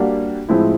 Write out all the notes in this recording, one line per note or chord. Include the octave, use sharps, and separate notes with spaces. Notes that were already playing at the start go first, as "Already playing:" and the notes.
Already playing: G3 A#3 D4 F#4
A2 F3 G#3 C4 E4